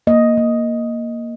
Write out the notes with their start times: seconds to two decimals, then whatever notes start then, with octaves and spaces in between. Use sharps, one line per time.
0.07 A#3 D#5
0.37 A#3